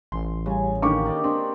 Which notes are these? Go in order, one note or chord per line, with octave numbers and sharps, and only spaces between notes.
A1 C6
C#3 G3 G#5
D3 D#3 A#3 G4 C#6 D6
A#4 D5 D#5
C4 D4